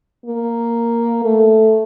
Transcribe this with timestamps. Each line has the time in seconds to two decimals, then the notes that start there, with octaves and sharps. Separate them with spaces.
0.25 A#3
1.24 A3